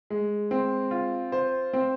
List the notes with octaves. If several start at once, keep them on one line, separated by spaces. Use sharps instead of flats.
G#3
C4
F4
C5
C4